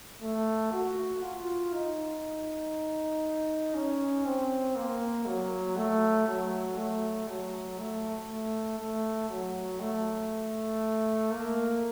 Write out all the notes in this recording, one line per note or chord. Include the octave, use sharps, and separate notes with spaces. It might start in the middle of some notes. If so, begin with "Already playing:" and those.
A3
F#4
F4
D#4
C#4
C4
A#3
F#3
A3
F#3
A3
F#3
A3
A3
A3
F#3
A3
A#3